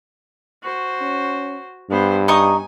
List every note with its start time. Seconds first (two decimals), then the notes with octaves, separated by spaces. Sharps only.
0.63 F#4 C5
1.01 C#4
1.90 G2 B3 C5
2.28 D#4 G#5 C#6 D#6